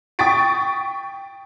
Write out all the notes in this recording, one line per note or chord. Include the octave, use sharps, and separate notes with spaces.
G5 C#6 D#6 A6 B6 D7